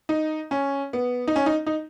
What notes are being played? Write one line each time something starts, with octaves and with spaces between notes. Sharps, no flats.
D#4
C#4
B3
D#4
C#4
D#4
D#4